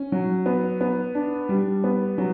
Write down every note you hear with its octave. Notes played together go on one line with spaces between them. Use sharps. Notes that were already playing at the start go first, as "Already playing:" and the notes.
Already playing: C#4
F#3
B3
B3
D4
G3
B3
F#3